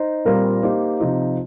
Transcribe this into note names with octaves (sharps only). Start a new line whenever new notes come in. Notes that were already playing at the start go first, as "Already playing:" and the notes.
Already playing: D#4 C5
A#2 G3 C4 F4 A#4
A#3 D#4 G4 C5
C3 F3 D#4 C5